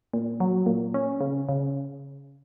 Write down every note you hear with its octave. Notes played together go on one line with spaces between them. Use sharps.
A#2
F#3
A#2
C#4
C#3
C#3